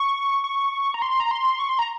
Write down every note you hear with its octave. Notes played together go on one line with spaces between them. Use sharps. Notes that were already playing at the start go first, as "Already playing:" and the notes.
Already playing: C#6
C#6
A#5
C6
A#5
C6
C#6
C6
A#5